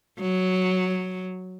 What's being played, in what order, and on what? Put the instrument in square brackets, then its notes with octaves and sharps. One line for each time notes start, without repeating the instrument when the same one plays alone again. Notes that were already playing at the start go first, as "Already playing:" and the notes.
[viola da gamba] F#3